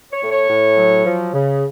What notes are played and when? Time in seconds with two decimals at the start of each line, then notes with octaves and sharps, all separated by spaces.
0.13 C#5
0.22 A2
0.31 C#5
0.50 A2
0.77 F#3
1.06 F3
1.34 C#3